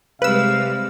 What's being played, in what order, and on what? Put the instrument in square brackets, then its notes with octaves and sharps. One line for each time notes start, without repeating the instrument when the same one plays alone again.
[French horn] C3 [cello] G3 G#3 [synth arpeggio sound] B4 E6 [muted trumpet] F5